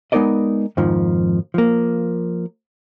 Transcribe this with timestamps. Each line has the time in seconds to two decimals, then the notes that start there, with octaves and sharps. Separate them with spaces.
0.12 G#3 B3 D#4 A#4 D5 D#5
0.77 F2 G#2 D#3 F3
1.54 F3 A#3